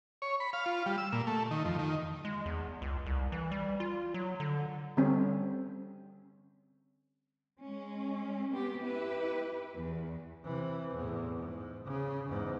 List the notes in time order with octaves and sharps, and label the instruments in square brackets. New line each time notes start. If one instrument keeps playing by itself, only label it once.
[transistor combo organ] C#5
B5
F5
F4
G3
E6
A#2
A3
D#3
F2
D#3
[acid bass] G#3
E2
C#2
C2
E3
G3
F4
F#3
D3
[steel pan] D3 G3 C4 C#4
[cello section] G#3 C#4
B3 C4 G4
E4 G4 B4
E2
[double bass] C3 E3
E2 A2
G#2
C#3
E2 G#2